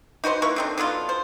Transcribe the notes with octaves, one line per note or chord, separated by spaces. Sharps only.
D#4 F#4 B4 C5
A#3 E4 B4 C#6
D3 C4 D#4
D3 F#3 B3 F4
C5